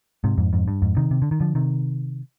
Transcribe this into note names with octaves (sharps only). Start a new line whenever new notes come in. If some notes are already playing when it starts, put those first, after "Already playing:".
G#2 C3
F2 G#2
F2 G#2
G2
F2 G#2
C3 D#3
C3
D3
D#3
D3 F3
C3 D#3